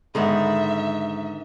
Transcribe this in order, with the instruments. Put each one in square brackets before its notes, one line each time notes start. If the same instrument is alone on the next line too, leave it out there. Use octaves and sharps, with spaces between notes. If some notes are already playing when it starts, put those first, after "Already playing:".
[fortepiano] G#2 [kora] D3 D#3 B3 [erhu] E5